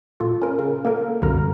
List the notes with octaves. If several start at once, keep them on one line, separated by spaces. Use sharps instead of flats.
A#2 F4 A4
C#4 A#4
C#3
A#3 A4 A#4
C2 F#2 B2 D3 A#5 F6